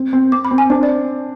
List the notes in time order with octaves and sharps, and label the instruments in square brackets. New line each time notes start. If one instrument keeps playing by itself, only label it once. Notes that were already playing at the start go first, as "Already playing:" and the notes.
Already playing: [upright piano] C4
C4
[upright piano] C4 [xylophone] D6
[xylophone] B5
[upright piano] C4
[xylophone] G#5
[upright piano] D4 [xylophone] C5
[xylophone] D5